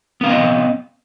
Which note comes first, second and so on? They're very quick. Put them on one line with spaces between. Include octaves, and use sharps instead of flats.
B3 F5 C4 D#5